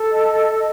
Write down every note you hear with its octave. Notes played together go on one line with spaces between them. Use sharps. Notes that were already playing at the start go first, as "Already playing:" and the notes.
Already playing: A4
D#5
D#5